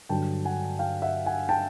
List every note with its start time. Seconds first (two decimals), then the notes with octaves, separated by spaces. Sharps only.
0.09 G2 D3 F#3 G5 A5
0.45 F#5 G#5
0.79 F5 G5
1.02 E5 F#5
1.26 F#5 G#5
1.49 G5 A5